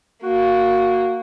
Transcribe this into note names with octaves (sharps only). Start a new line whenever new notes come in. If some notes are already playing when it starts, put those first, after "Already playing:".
A#3 F#4